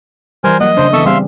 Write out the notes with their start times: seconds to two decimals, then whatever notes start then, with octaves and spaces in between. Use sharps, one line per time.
0.44 E3 G3 A#4 C5 G#5
0.60 F#3 A#3 D#5 F#5
0.77 C#3 D4 C5
0.93 E3 B3 A4 E5 C#6
1.06 G3 C4 G#4 E5 F5 C6